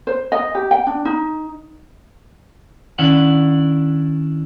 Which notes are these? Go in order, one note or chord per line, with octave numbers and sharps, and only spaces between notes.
C5
D#5
G4
G5
D4
D#4
D#3 C#4 D4 E4 F#5